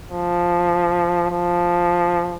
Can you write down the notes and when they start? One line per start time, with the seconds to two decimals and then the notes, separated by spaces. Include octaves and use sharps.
0.11 F3
1.31 F3